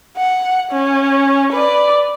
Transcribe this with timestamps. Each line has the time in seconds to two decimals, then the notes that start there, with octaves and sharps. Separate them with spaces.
0.17 F#5
0.71 C#4
1.52 B4 D5